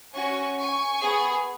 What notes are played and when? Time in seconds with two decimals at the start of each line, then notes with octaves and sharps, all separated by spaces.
0.13 C#4 F#4 G#5 C#6
0.58 G#5 C#6
1.02 B3 G#4